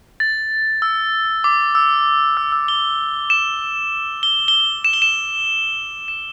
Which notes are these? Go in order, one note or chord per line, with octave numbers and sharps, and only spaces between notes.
A6
E6
D6
E6
E6
E6
G7
E7
G7
G7
E7
G7
E7
E7